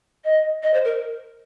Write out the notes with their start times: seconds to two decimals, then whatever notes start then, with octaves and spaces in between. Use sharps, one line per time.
0.25 D#5
0.63 D#5
0.74 C5
0.85 A#4